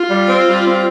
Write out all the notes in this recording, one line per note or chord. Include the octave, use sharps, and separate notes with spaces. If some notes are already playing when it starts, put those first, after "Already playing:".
Already playing: F4
G3
C4
G3
C4